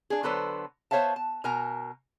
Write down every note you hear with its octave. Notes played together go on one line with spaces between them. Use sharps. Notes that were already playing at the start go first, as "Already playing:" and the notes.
D4 G#4
D3 F#3 B3 A4 B4 C5
B3 C5 C#5 E5 F5 A5
A5
B2 A#4 G#5 A#5